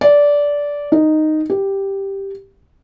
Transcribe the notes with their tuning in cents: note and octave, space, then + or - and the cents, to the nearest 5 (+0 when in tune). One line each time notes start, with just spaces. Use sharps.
D5 -15
D#4 -5
G4 +0